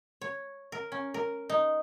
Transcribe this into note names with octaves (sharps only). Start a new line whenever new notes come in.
C#5
A#4
C#4
A#4
D#4